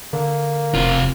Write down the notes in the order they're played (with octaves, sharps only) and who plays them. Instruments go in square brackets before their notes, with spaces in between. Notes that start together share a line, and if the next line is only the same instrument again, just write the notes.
[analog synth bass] D3 [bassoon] A#3
[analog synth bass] E1 [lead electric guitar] C3 F4